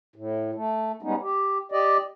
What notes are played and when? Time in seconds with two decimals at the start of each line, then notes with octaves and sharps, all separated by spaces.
0.16 A2
0.55 A3
1.02 G3 G#3 B3 C#4 D#4
1.22 G4
1.72 G4 D5 D#5